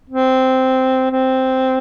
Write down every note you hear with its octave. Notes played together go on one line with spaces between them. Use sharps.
C4
C4